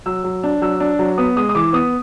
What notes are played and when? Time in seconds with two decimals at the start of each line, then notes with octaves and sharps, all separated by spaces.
0.06 F#3 E6
0.24 F#3
0.43 D4
0.62 F#3 E6
0.80 D4
0.99 F#3
1.18 B3 D#6
1.37 G#3 D#6
1.49 D#6
1.55 E3 D6
1.73 B3 D#6